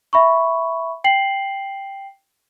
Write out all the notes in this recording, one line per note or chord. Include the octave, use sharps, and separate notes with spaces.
E5 B5 C#6
G5 C7 F#7